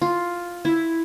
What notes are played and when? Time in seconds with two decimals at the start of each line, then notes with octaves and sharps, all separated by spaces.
0.02 F4
0.65 E4